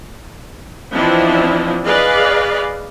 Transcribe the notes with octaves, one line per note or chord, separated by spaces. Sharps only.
E3 F3 C4 D4 E4 D#5
G#4 B4 D5 D#5 F5